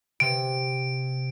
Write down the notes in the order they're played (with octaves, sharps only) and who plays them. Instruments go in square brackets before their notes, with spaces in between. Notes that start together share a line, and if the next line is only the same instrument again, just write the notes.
[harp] C3 [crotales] D7